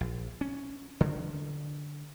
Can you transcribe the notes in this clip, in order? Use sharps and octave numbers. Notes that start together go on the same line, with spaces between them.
A#1
C#4
D3